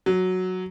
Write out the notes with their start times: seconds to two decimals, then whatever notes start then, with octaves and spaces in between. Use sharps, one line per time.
0.06 F#3